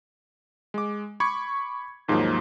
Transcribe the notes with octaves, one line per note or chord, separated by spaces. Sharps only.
G#3 D6
B5 C#6 D6 G#6 C#7
D#2 G#2 F3 F#3 A#3